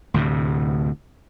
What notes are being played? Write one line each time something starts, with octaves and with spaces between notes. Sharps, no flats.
D2 A2 C3